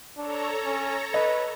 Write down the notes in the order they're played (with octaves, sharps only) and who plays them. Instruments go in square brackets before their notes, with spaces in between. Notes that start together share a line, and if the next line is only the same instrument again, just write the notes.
[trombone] D4 [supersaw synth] A4 C#5 A#5
[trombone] C#4
[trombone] B4 [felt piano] D#5